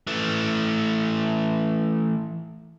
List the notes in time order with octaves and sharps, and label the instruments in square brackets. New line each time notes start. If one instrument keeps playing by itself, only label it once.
[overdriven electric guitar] E3 A3